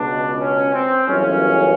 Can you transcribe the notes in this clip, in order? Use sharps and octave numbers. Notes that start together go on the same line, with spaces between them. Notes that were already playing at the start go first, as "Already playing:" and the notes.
Already playing: C#2 B2 D4
C#4
C4
G1 F#2 C#3 E3 C#4